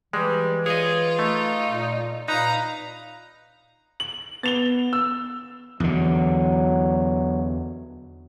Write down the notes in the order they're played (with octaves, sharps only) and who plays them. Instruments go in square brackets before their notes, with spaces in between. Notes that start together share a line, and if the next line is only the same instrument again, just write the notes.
[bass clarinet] E3 [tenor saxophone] G3 [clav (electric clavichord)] G#3
[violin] F4 [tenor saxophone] G#4 [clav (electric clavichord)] C#5 D#5
[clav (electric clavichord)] A3 [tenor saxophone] D#4
[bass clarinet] A#2
[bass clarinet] A#2 [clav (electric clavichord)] D#4 [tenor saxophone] B4 [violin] F5 A#5
[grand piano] F#7
[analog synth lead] B3 [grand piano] A6 F7 G7
[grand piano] E6
[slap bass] E2 D3 [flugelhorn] F#3